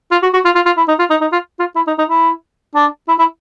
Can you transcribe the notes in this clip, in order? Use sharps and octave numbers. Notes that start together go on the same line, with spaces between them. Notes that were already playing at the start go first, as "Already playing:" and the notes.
F4
F#4
F#4
F4
F4
F4
E4
D#4
F4
D#4
D#4
F4
F4
E4
D#4
D#4
E4
D4
E4
E4